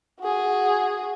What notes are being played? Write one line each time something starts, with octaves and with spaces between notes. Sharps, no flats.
F#4 G#4